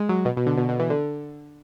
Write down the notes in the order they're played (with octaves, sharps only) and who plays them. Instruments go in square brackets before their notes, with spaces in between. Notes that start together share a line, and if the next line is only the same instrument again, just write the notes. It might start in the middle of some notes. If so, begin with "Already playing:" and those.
Already playing: [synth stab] G#3
F#3
B2
B2
D3
B2
B2
E3
D3